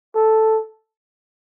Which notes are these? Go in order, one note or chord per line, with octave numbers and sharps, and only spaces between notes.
A4